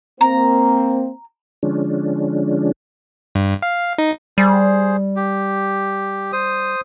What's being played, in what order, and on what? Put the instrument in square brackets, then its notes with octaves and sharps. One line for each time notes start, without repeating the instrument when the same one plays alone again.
[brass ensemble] A#3 C4 [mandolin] A#5
[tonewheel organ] D3 F3 G#3 C#4 D4
[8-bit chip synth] G2
F5
D#4
[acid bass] G3 [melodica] G#4 C5
[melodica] G4
C5 D#6